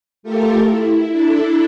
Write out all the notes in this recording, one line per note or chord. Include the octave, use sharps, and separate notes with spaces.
A3 F4 G4 A4 A#4
E4
D4 E4 A4